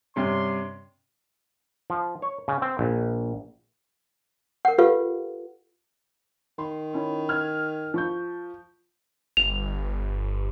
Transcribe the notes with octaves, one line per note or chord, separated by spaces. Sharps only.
G2 C3 C#4 C6
F3
C#5
C#3
C4
A#1
A#4 F#5
F4 G4 A4 B4 F5
D#3 C6
C#4 E4
F6 G#6
F3 C#6 G6
G1 F7